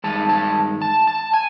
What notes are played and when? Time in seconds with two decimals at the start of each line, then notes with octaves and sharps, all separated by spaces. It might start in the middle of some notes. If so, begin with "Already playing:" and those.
0.04 G2 D#3 G#3 A5
0.29 A5
0.82 A5
1.07 A5
1.33 G#5